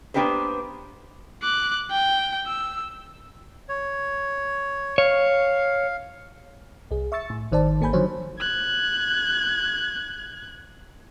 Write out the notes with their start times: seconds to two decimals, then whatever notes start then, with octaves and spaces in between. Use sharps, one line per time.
0.14 A#3 B3 D4 G4 B4 C5
1.43 D6 F#6
1.91 G5
2.47 E6
3.69 C#5
4.98 C#5 F5
6.91 C2 G#4
7.12 E5 C#6 E6 A6 C#7
7.30 A2
7.52 G#1 D#3 C5 D5 A5
7.81 G#1 A#3 A4 G#5 B5 G6
7.93 D3 D#3 F3 F#3 C5 C#5
8.39 F#6 G#6